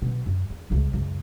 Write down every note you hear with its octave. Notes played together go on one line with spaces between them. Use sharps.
B2 F#3
F#2
E2
G1 C#2
C#2 F#2